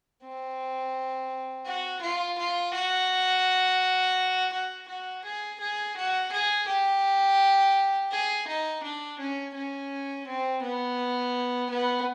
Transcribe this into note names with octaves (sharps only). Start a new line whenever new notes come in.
C4
F#4
F4
F4
F#4
F#4
F#4
G#4
G#4
F#4
G#4
G4
G#4
D#4
D4
C#4
C#4
C4
B3
B3